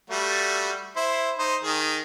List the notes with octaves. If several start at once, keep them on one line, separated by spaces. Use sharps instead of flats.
G3 A3 F#4
E4 C5
D#4 C5
D#3 G#4